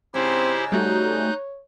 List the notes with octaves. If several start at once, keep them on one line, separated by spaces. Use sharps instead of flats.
G#2 C#3 C4 E4 G4 C5
G3 A3 D#4 F#4 C#5 F#6 G6